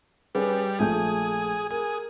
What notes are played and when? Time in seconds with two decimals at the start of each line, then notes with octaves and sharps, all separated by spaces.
0.35 G3 C#4 G#4 B4
0.79 A#1 A3 G#4 G6
1.71 G#4 A#4